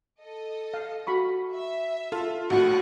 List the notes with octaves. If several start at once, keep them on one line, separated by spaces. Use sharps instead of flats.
A4 D#5
F5
F#4 B5 C#6
E5
F4 A4
A#1 A2 F#4 A5 C#6 F#6